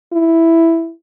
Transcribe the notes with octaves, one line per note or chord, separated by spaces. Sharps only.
E4